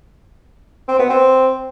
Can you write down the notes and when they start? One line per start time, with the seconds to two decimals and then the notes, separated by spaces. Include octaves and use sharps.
0.88 C4
0.99 B3
1.10 C4